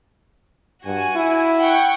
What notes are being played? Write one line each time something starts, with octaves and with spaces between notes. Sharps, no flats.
G2 F#4 G#5
E4
F#5 G5 C#6